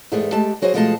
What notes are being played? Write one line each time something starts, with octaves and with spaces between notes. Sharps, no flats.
E2 G#2 A3 B3 G4 G#4
G#3 A3 G4 A5
F#3 F#4 G#4 C5 D#5
B2 F3 G#3 A3 D#5 A5